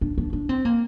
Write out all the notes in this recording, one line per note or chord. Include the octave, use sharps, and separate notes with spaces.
D4
D4
D4
C4
A#3